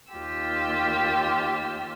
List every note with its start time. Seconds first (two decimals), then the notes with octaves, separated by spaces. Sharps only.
0.12 D#2 F4 G4 E6